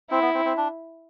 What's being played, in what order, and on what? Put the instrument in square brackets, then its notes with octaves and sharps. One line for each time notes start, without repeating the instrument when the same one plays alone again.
[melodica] C4 [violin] E4
[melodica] B3
C4
C4
D4